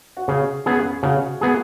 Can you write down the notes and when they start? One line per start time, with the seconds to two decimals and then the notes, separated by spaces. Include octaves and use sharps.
0.17 F#4
0.28 C#3 G#4
0.66 B3 C#4 G#4
1.03 C#3 F#4
1.41 B3 G#4